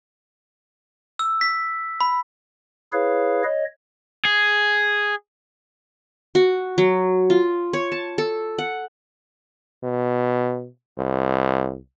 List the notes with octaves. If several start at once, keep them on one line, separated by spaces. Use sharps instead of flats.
E6
B6
B5
E4 G#4 B4 C#5 F5
C#5 D#5
G#4
F#4
F#3
F4
C#5
A5
A4
F#5
B2
C2